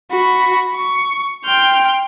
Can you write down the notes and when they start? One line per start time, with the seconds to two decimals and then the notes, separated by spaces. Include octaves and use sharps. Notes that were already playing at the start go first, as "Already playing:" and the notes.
0.11 F#4 B5
0.75 C#6
1.45 G5 C6 F6 G6